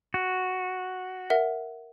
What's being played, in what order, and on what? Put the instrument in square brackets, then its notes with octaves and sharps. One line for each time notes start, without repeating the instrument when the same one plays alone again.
[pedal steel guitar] F#4
[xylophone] A#4 E5 F#5